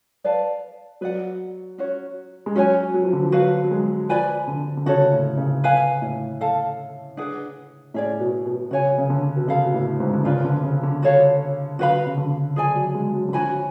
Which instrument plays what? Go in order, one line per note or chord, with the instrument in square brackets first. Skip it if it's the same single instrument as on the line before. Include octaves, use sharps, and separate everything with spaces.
[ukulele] B4 D5 F5 A5
[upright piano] F#3 [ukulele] B4 D5 F#5
[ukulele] C#4 F#4 C#5
[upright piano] G#3
[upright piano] F#3 [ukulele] C#4 F#4 C#5 G#5
[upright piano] F#3
F3
D3
F3
[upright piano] F#3 [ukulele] F#4 B4 F5
[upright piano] F#3
G#3
[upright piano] F3 [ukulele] B4 D5 G#5 B5
[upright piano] D3
D3
[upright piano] C#3 [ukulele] F#4 A4 C#5
[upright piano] A2
C#3
[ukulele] B4 F5 G#5
[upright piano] A2
[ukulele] A4 F5 A5
D4 G#4 B4 F#5
[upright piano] A2 [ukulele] C#4 G#4 D5
[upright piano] B2
B2
[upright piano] C#3 [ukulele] F#4 C#5 G#5
[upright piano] C#3
D3
B2
[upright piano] C#3 [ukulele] A4 F5 B5
[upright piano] B2
A2
G#2
D3
[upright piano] C#3 [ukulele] F4 B4 D5
[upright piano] D3
C#3
D3
[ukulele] F#4 A4 C#5 F5
[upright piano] D3 [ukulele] F#4 B4 F5 B5
[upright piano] C#3
D3
[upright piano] F3 [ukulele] G#4 D5 G#5
[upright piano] F#3
G#3
F#3
D3
[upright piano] F3 [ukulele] F#4 C#5 G#5 B5